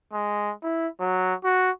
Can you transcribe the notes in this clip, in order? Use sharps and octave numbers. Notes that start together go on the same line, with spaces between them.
G#3
E4
F#3
F#4